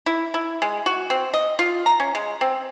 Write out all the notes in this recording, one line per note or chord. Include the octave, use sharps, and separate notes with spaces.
E4
E4
G#3
F#4
C4
D#5
F4
A#5
C#4
G#3
C4